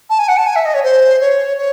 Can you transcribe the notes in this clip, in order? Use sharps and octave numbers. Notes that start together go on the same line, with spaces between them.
A5
G#5
F#5
A5
G#5
E5
D#5
C#5
C5
C#5
C#5